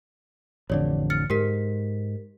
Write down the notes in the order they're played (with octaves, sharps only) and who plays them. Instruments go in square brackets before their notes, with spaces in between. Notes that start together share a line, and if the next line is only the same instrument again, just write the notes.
[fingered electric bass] A1 F2 D3 [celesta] C#5 D5
[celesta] F6 A6 C#7
[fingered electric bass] G#2 [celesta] G4 A#4 B6